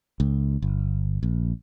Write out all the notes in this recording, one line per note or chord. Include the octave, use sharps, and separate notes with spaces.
C#2
G1
A#1